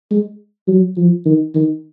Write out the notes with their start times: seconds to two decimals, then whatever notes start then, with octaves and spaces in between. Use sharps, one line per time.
0.11 G#3
0.68 F#3
0.97 F3
1.26 D#3
1.55 D#3